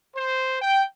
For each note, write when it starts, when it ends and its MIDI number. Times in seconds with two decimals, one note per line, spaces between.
0.15 0.60 72
0.61 0.85 79